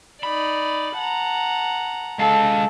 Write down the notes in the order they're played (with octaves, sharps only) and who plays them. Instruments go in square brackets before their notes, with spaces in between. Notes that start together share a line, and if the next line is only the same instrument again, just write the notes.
[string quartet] D#4 D5 [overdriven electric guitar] B5
[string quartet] F#5 A5 A#5
[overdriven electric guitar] G#3 F5 [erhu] A4